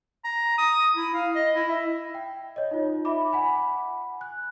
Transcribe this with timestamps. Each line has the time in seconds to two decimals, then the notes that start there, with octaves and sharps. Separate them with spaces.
0.24 A#5
0.58 D#6
0.96 E4
1.14 F5
1.35 D#5
1.55 E4
1.69 E5
2.15 G5
2.56 C#5 D#5
2.71 D#4 F4
3.05 E5 B5 D6
3.32 F#5 G#5 B5
4.21 F#6